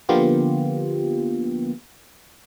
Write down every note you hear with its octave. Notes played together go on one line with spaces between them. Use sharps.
D3 F3 A#3 B3 F4 G4